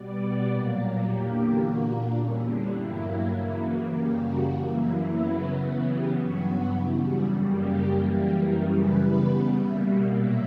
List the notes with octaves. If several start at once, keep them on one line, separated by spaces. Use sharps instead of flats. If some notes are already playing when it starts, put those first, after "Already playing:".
Already playing: B2 G3 B3 D5
A#2 F#3 A#3
A#4
E2 D3 A#3 G4
A#2 A#3 F#4
D4
E2 D3 G3 C#4
D4
G2 F#3 A#3 E4
C#3 E3 A#3 E4
F#4
F#2 C#3 G3 A#3 G4
F#4
F#2 E3 A#3
E4
C#3 F#3 B3
C#3 E3 B3 F#4
G4
G2 F#3 B3 F#4
E2 C#3 G3 E4
F#4
F#2 C#3 G3 A#3 G4
F#2 E3 G3 A#3
G4
F#2 C#3 E3 G3 A#4
B4
C#3 G3 B3
B2 G3 A#3 E5
F#5
A#2 F#3 A#3 E5